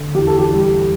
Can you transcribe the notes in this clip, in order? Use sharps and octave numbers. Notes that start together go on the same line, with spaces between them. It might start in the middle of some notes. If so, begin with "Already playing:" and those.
Already playing: D3
E2 G4
A4
G4
G3